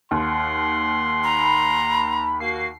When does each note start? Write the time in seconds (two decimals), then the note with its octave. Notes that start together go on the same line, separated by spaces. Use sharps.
0.11 D#2 F#5 C6
1.24 A#5 B5
2.40 A#3 F#4 C7